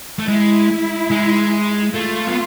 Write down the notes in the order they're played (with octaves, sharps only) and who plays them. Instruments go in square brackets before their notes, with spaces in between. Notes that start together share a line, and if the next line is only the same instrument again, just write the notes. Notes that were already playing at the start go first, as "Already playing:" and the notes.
[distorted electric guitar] A3
[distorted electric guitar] G#3 [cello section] E4
[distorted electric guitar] G#3
[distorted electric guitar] A3 [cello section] F4
[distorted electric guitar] B3